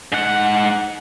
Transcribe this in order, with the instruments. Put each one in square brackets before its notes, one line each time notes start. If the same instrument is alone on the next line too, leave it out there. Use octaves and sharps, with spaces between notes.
[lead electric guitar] G#2 F#5